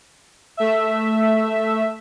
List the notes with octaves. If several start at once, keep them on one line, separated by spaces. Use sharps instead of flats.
A3 E5